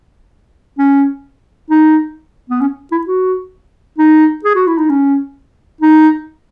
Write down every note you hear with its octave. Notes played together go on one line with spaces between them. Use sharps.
C#4
D#4
B3
C#4
E4
F#4
D#4
G#4
F#4
E4
D#4
C#4
D#4